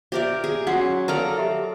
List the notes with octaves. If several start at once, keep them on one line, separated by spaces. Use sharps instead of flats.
G4 A#4 C5 D5 E5
G#4
F#3 C#4 F#5 C6 C7
A4 A#4 D5 F5 A#5 F6
G4 A#4 E5